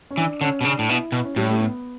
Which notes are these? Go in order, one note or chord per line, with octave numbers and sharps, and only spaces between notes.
C#4
E3 D4
D3 C#4
B2
C#3 D4
A2
B2 E4
B2
C#4
A2 G3
A3
B3